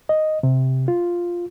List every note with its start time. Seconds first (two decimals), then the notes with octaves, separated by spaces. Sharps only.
0.09 D#5
0.43 C3
0.88 F4